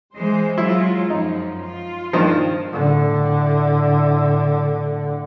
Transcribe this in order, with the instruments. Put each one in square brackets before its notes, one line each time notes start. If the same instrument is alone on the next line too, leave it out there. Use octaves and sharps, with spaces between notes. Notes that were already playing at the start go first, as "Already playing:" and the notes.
[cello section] E3 G#3 C5
[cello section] F#3 G#3 F4 [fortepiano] E4
[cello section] F#2 F3 [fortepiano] D#4
[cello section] F4
[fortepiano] G2 D#3 F3
[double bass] A2 D3